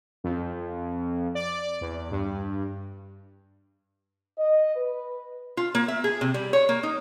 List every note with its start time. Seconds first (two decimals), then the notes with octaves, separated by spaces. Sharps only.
0.24 F2
1.35 D5
1.81 E2
2.11 G2
4.38 D#5
4.76 B4
5.57 F4
5.75 A#3
5.88 E5
6.04 G#4
6.21 C3
6.34 G3
6.53 C#5
6.69 A#3
6.83 D#4